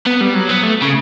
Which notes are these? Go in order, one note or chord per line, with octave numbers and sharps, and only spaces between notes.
B3
G3
F#3
B3
A3
C#3